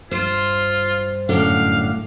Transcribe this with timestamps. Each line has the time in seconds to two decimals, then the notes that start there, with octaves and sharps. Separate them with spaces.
0.11 G2 F4 C5
1.29 F#2 A2 D3 F5